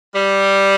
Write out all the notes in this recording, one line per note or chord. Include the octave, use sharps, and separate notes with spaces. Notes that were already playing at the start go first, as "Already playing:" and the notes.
G3